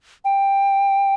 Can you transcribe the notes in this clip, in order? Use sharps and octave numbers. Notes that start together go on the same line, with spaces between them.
G5